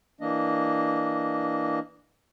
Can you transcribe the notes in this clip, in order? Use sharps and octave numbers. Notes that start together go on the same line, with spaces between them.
E3 A#3 D4 D#5